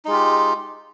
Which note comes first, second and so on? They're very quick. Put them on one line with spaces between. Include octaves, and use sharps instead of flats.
D#4 G#3 F4 G4